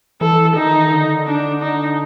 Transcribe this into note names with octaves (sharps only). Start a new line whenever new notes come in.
E3 A4
D#3 D#4
D3
D4
D#4